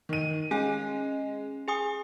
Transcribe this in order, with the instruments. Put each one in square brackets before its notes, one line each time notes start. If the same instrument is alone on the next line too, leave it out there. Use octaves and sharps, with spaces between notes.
[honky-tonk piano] D#3 D#7
[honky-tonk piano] G#3 [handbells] C#4 G#5 F#6
[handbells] G#4 G#5 D#6